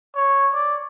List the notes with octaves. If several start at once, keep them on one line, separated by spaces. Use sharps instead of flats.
C#5
D5